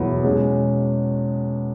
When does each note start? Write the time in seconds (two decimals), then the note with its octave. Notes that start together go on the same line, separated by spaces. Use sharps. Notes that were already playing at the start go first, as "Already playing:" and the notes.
Already playing: E2 B2 F#3 B3 E4
0.24 B2 G#3 C#4